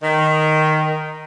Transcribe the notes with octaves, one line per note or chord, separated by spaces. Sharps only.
D#3